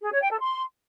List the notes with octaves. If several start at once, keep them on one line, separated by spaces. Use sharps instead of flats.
G#4
C#5
G5
A4
C6